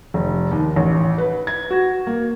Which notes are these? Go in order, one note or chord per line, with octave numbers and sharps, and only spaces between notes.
F1
D#2
A1
B4
G#6
F#4
A#3